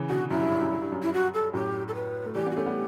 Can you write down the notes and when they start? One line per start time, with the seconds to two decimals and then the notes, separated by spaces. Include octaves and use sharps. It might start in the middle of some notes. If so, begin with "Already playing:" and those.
Already playing: C#3 E3
0.09 B2 D3 F#4
0.30 F#2 E4
0.41 G2
0.51 G2
0.61 F#2
0.71 G2
0.82 G2
0.92 F#2
1.02 E4
1.13 F#4
1.34 A4
1.53 F#2 A2 G4
1.88 A4
1.95 B4
2.26 A3
2.35 E3 G3 G4
2.46 B3 D4
2.51 F#4
2.56 A3 C#4 G4
2.66 G3 B3